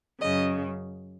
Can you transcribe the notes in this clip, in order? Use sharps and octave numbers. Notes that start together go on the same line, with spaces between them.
F#2 C#3 D#5